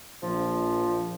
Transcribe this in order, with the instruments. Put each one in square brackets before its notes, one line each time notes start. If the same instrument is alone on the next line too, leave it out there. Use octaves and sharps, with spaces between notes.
[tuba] A#1 [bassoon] F3